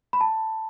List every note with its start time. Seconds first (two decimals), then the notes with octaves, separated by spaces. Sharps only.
0.13 B5
0.21 A5